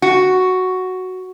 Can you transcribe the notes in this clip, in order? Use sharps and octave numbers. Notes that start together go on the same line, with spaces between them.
F#4